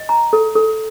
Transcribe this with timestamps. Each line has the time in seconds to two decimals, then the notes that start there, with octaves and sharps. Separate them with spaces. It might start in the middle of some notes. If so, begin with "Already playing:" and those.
Already playing: D#5
0.09 A#5
0.33 A4
0.55 A4